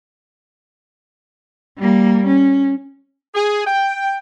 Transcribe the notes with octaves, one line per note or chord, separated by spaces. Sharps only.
G3 A#3
C#4
G#4
G5